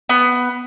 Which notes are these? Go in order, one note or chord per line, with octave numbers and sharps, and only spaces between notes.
B3